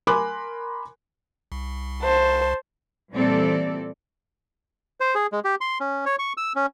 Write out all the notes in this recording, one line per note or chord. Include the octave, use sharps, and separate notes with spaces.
A#4 G#5 B5 C6 D6 F#6
C2
C5 A5
A#2 E3 G3 C4 A4 D5
C5
G#4
G#3
G4
C6
C#4
C#5
C#6
E6
C#4